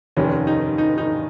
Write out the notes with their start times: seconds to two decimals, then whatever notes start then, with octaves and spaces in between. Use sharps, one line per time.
0.17 F1 D#2 D#3 C#4
0.47 D#4
0.78 D#4
0.98 D#4